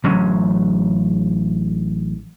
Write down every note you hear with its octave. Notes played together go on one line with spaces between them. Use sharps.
A1 F#3 C#4